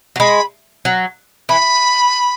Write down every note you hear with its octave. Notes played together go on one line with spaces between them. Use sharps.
F#3
G#3 B5
F#3
E3 B5